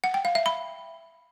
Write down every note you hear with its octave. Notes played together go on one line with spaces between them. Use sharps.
F#5
G5
F5
E5
B5